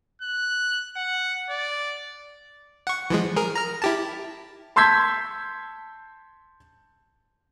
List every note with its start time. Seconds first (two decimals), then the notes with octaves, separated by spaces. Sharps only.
0.22 F#6
0.97 F#5
1.50 D5
2.87 F#5 C#6
3.10 E3 F3 G#3
3.36 G#4 A#4
3.55 A#5 F6
3.82 E4 G4 A5
4.76 A5 C6 E6 G6 G#6 B6